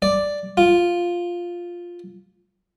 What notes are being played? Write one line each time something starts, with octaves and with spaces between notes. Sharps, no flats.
D5
F4